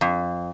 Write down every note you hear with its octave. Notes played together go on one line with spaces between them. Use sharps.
F2